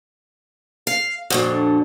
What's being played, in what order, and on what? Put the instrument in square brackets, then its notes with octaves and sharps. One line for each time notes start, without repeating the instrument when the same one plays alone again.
[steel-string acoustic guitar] F5
[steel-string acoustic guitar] F2 A#2 D3 [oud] D4 F#4